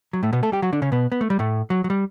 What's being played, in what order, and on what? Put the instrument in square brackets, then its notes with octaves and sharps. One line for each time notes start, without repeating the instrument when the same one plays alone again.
[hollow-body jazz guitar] F#3
A2 A3
B2 B3
A3 A4
G3 G4
F#3 F#4
D3 D4
C#3 C#4
B2 B3
B3
A3
G3
A2 A3
F#3
F#3
G3